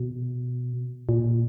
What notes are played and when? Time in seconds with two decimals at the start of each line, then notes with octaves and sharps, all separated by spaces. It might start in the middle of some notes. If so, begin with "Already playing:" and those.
Already playing: B2
1.09 A#2